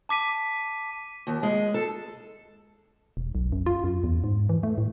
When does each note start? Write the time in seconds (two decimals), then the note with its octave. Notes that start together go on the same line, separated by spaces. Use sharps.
0.09 A5 D6 B6 D#7
1.27 D#2
1.43 G#3
1.74 A4
3.17 E1
3.35 B1
3.52 F#2
3.66 F4
3.84 F#2
4.04 E2
4.24 G#2
4.49 E3
4.63 A3
4.78 A2